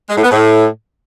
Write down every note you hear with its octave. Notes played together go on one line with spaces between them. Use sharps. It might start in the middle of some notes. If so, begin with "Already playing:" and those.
G#3
A2
B3
A2